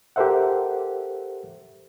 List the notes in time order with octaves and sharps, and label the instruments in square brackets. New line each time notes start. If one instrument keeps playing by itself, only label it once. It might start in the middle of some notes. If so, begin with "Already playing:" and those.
[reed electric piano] G4 A4 A#4 C5 E5 F#5